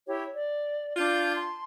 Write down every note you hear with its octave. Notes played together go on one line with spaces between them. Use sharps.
E4 G4 C#5
D5
D4 F4 F5 G6
A5 C6